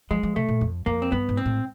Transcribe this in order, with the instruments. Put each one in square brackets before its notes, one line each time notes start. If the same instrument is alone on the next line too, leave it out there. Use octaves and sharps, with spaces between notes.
[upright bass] F3 [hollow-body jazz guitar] G#3
[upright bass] F3
[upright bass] C3 [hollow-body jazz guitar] A3
[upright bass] A#2
F2
[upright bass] F2 [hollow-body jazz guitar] A#3
[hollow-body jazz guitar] C4
[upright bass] G2 [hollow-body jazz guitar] B3
[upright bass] G#2
[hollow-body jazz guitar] C4
[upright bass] A2